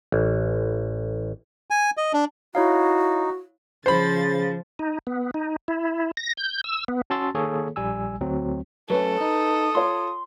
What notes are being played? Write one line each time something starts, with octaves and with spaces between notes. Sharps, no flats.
A1
G#5
D#5
D4
D#4 E4 F#4 C#5 F5
C#3 F3 C5 B5 A6
D#4
B3
D#4
E4
A#6
G6
E6
B3
C#4 F#4 A5 C6 E6 A6
D#3 A#3 G#4 A4 C#5
A#1 G3 G#5 E6
D2 F#3 C4
F#3 A3 C#4 A4 B4
D#4 D#6
F4 C#5 C6